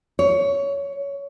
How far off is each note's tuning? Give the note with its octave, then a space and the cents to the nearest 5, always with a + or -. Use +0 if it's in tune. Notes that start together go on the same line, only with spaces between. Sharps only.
C#5 +15